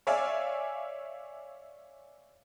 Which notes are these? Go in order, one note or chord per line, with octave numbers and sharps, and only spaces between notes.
C#5 D5 E5 F5 G#5